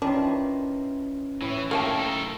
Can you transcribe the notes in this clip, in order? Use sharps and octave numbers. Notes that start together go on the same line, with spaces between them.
D#3 E3 C#4 D4 F4
A2 E3
D#3 A3 A#3 C4 G4 G#5 A5
D#4 A4